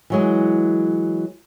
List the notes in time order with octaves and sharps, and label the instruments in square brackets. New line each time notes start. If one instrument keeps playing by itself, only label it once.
[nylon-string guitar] E3 F#3 G#3